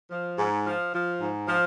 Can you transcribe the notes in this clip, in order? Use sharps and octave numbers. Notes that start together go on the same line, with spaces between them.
F3
G#2
F3
F3
G#2
F3